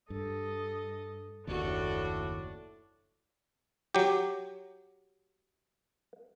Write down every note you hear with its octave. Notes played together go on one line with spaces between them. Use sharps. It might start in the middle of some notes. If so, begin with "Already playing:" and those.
G2 A4 D#5
F#1 D#2 A2 D4 F#4 A4
F#3 G4